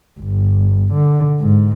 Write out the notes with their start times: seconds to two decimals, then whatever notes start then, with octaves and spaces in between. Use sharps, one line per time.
0.19 G1
0.93 D3
1.40 G#2